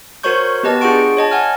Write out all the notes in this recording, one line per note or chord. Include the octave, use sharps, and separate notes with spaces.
F#4 A#4 C5 C#5 C#6 G6
B3 G4 B4 D#5 A5
D4 F4 G#4 F#5 C#6 D7
C#5 D#5 A5
F#5 G#5 F6